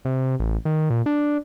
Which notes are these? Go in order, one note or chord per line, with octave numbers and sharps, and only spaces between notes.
C3
A1
D#3
A#2
D4